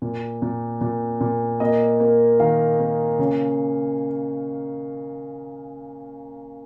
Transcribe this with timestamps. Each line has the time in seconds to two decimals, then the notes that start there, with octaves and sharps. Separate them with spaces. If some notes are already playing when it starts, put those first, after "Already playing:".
0.02 A#2
0.42 A#2
0.81 A#2
1.21 A#2
1.60 A#3 D#5
2.00 A#3
2.40 D#3 F5
2.80 A#3
3.19 C#3